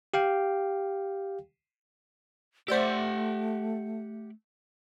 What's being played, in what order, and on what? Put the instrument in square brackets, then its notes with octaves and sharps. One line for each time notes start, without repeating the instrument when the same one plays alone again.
[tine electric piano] G4 F5 G5
[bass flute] A3 [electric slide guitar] G4 F#5 [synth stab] C5 D5 E5